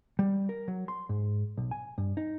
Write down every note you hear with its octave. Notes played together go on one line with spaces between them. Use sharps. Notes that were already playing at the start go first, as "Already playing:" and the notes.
G3
A#4
F#3
C6
G#2
B1
G#5
G2
D#4